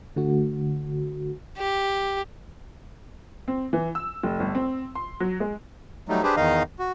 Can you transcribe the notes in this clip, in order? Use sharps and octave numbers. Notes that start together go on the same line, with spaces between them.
D3 A3 F#4
G4
C4
E3
E6
F1
G1
C4
C6
F#3
G#3
F#3 G3 A3 D#4
D4 G4 G#4 B4 C5
E2 D#3 D#4 D#5 F5
F#4